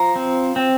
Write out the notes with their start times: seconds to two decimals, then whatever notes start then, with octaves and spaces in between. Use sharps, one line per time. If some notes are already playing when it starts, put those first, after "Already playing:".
Already playing: F3 A#5
0.16 C4
0.56 C4